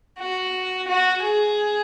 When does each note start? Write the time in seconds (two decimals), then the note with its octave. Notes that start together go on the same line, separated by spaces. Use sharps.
0.19 F#4
0.88 F#4
1.22 G#4